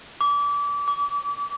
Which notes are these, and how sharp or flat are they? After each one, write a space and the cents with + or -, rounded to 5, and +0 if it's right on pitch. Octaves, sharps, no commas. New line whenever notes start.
D6 -30
D6 -40